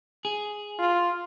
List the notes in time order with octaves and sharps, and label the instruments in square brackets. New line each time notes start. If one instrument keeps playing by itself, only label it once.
[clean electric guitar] G#4
[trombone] F4